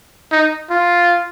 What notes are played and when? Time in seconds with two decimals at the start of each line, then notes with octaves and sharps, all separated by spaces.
0.32 D#4
0.70 F4